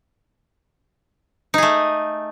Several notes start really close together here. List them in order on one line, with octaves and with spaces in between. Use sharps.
D#4 G#4 A3